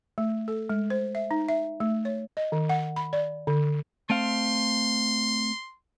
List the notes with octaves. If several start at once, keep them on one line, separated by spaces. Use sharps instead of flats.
A3
A4
G#3
C5
E5
D#4
E5
A3
C#5
D#5
D#3
F#5
B5
D5
D3
A3 C4 F5 C6